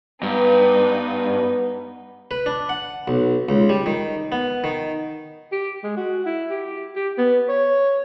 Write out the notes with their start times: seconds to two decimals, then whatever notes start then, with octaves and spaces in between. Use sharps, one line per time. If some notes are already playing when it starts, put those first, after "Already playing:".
0.23 G2 B3 D#4 B4
2.31 B4
2.46 D4
2.69 F#5
3.08 B1
3.49 C#2
3.69 G3
3.86 D#3
4.32 B3
4.64 D#3
5.52 G4
5.83 G#3
5.97 F#4
6.26 E4
6.50 G4
6.95 G4
7.18 B3
7.49 C#5